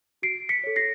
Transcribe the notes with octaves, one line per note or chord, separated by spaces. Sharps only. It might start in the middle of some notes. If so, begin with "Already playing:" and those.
F#4 C7 D7
B6 C#7
A4 C#5
A#6 C7